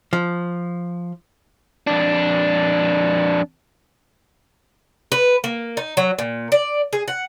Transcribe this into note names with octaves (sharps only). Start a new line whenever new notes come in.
F3
F2 D4
B4
A#3
D#4
F#3
A#2
D5
G#4
F#5